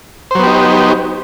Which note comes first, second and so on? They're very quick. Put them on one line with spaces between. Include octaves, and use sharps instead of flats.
C5 F#3 B3 G4 D#4